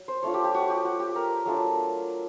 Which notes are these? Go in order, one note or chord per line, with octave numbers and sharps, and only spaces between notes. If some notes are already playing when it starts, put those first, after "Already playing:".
Already playing: F#3
C5
A3 D4 F4 C#5
G4
G4
F#4
G4
F#4
G4
A#4
F#3 A3 D4 F4